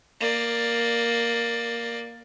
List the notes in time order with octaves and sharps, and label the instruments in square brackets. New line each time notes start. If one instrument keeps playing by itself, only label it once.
[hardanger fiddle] A#3 D5